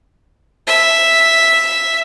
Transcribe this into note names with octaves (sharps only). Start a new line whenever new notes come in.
E5